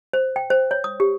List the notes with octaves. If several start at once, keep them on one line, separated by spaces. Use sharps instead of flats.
C5
G5
C5
C#5
D#6
G4